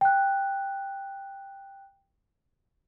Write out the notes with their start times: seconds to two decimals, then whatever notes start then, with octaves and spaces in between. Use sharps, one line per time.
0.01 G5 F#6